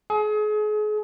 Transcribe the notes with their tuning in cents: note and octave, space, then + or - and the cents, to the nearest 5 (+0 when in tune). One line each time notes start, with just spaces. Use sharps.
G#4 +35